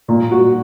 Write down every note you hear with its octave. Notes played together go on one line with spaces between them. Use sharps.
A#2
F#4